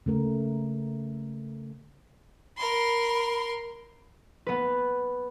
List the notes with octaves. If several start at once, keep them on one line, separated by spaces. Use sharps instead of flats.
C#3 A3 A#4
A#4 B5 C6
B3 B4